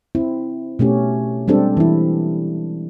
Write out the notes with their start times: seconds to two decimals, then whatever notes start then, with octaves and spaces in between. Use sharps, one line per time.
0.15 C4 E4
0.79 B2 A3 C#4 G4
1.48 G3 G#3 C4 D4 G4 A4
1.77 E3 E4